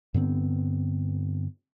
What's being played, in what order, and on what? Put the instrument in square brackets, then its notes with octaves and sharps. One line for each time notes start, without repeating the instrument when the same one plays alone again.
[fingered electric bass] G2 D3 B3 C4